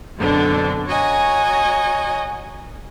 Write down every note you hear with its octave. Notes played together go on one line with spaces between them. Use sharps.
F#2 B2 D3 C4 D4
F#4 C#5 D#5 G#5 A#5